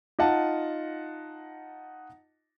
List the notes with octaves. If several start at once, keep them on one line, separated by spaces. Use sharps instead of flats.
D#4 F4 D#5 F#5 A5